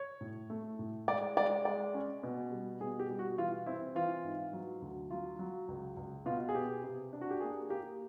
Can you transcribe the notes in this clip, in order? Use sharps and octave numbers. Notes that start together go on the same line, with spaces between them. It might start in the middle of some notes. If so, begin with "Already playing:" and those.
Already playing: C#5
A2
A3
A2
G#3 D5
G#3 D5
G#3 D5
C#4
B2
G3
B2 G#4
G4
G3
F#4
E3 F4
C4 E4
E3 F4
G#2
F#3
D2
F#3 F4
F#3
C#2
C#2
B2 F4
G#4
B3 G4
C3
D4
F#4
G4
A#3 G#4
A#3 G4